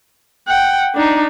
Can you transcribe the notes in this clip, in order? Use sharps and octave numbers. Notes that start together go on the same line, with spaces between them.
F#5 G5
D4 D#4